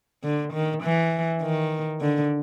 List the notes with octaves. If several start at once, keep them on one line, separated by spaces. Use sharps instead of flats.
D3
D#3
E3
D#3
D3